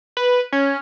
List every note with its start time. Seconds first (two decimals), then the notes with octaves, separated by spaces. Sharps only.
0.17 B4
0.52 C#4